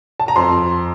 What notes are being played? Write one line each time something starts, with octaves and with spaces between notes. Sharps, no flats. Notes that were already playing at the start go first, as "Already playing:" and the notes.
A5
A#5
F2 C6